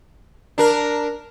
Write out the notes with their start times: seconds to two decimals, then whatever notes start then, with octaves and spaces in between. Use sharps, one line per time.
0.58 D4 A#4